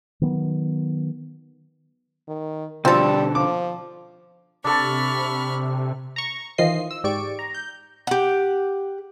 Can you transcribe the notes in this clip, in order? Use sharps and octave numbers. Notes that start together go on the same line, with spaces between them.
D#3 F#3 B3
D#3
B2 D3 F3 G3 C4 A4 A5
F3 D6
C3 D4 A4 B5 C#6 F6
A#5 C#6
D#3 E3 F4 C5 D#5 C7
E6
G#2 G4 D5 C#6 D7
A#5
G6
G4 F#5